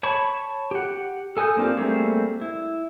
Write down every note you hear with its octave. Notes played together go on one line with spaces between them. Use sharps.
C#5 A5 B5 C#6
G4 F#5
A4 G#5 D#6 F#6 G6
A#3 C4 D4 F4 G4
G3 A3 A#3 C4 G#4
E4